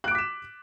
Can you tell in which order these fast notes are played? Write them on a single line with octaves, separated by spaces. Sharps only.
F#6 D7 D6 B6 E7